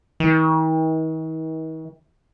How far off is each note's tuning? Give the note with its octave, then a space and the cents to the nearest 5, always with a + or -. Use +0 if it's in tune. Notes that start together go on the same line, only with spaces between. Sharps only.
D#3 +45